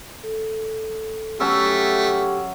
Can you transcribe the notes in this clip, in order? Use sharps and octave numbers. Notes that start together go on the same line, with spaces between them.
A4
F#3 A3 C#4 G4 E5